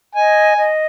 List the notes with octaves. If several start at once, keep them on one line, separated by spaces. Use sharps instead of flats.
D#5 G#5
D#5